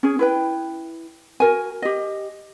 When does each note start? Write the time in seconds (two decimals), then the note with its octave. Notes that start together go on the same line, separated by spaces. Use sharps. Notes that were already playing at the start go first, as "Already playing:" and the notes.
0.03 C#4 G#4
0.19 E4 B4 G5
1.40 F#4 A#4 G#5
1.82 G4 D#5